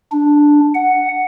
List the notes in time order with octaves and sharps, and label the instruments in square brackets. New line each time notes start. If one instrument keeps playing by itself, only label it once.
[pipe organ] D4
F#5